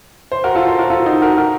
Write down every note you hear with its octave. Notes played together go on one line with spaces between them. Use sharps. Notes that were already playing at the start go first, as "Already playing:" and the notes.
C5
F#4 A#4
F4 A4
A4 C5
F#4 A#4
F4 A4
D#4 F#4
F#4 A#4
F#4 A#4